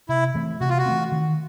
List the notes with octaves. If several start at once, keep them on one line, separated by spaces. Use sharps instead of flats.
C3 E4
E3 A3 C4
C3 F#4
F4
F#4
E3 A3 C4
D#3